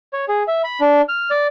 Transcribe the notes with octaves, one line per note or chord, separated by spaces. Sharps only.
C#5
G#4
E5
B5
D4
F6
D5